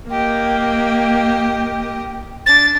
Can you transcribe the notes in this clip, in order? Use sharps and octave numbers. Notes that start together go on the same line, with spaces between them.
A#3 G4 D#5 G5
D4 A6